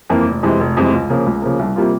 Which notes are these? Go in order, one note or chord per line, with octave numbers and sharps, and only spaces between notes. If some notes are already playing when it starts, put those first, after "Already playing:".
F2 E3 A#3
F1
F2 C3 E3 G#3
F1
F2 C3 E3 G#3
C#2
C#3 F3 A#3
C#2
C#3 F3 A#3
C2
C3 G3 A#3 F4